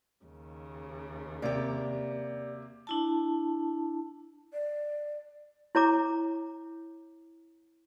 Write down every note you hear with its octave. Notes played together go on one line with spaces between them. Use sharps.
D#2 C#3
C3 A#3 G4 D5
D4 E4 A5
D5
E4 C#5 A#5 D6